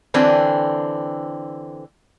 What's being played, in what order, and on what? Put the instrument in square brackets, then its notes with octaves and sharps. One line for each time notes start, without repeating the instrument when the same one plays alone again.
[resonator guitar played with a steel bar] D3 E3 C4 D4